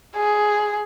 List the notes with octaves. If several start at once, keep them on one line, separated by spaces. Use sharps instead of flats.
G#4